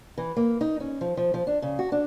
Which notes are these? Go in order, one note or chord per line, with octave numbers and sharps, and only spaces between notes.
E3
A#3
D#4
C#4
F3
F3
F3
D4
C#3
F#4
D4